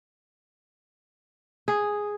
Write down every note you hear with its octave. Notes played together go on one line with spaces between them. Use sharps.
G#4